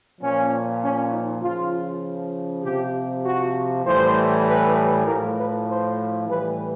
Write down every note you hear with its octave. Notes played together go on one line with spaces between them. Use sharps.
A#2 F3 C#4
C#4
D#4
C#3 F3 F4
C3 F3 G4
F#4
A2 E3 G3 C5
B4
A2 F3 A#4
B4
C5
A2 E3 G3 B4